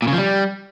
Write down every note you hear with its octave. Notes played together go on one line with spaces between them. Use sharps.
A#2
C#3
F3
G3